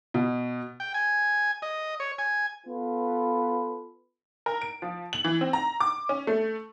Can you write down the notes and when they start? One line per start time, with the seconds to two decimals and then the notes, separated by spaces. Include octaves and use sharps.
0.14 B2
0.80 G5
0.94 G#5
1.62 D#5
2.00 C#5
2.19 G#5
2.66 B3 F4 A4 B4
4.46 A#4
4.62 D7
4.82 F3
5.13 F#7
5.25 E3
5.41 C4
5.53 A#5
5.80 D6
6.09 C#4
6.27 A3